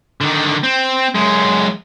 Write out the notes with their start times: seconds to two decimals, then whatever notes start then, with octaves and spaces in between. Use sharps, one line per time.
0.21 D3 D#3
0.64 C4
1.15 F#2 G#3